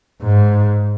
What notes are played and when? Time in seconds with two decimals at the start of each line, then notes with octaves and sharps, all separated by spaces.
0.22 G#2